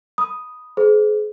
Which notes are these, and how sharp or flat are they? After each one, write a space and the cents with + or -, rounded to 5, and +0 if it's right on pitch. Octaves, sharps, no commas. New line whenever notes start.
B5 +0 D#6 +0
G#4 +35 C5 -25